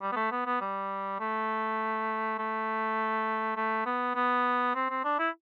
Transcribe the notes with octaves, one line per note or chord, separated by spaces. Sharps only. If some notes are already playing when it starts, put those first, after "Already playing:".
G3
B3
A3
B3
B3
G3
A3
A3
A3
B3
B3
C4
C4
D4
E4